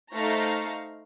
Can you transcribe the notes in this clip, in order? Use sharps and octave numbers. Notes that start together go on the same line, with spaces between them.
A3 D#4 C5 F5 A#5 C#6